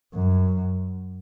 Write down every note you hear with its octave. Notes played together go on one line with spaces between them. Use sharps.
F#2